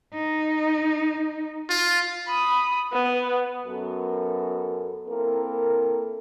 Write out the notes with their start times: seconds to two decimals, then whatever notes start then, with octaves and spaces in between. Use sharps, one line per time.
0.14 D#4
1.70 F4
2.27 B5 D#6
2.93 B3
3.67 F#2 B3 F#4 A4 A#4
5.08 A#3 C4 E4 A4 A#4